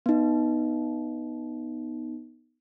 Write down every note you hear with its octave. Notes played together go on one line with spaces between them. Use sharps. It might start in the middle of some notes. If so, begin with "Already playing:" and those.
B3 D#4